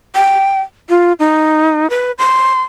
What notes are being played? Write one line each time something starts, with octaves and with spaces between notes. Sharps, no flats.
G5
F4
D#4
B4
C6